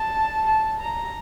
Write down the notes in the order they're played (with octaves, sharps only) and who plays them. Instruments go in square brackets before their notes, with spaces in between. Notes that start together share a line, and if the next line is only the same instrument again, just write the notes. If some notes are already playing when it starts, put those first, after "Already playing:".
Already playing: [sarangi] A5
A5
A#5